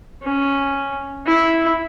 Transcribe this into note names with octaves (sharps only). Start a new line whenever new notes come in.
C#4
E4